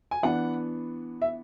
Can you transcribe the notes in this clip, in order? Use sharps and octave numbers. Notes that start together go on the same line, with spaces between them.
G#5
E3 B3 D4 F#5
E5